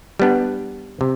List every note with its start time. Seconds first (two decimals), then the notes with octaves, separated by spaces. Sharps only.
0.20 G3 B3 D4
1.01 C3